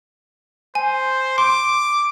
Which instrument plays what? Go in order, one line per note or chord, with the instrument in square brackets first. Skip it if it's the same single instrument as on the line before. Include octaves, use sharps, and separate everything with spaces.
[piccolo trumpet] C5 [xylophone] G#5
[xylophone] C6 [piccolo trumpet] D6